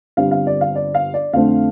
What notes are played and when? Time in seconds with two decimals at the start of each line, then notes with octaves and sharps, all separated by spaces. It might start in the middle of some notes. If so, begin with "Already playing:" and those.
0.17 G1 G2 G3 C4 F5
0.31 F5
0.47 D5
0.61 F5
0.76 D5
0.95 F5
1.14 D5
1.33 F2 D3 A3 C4 F5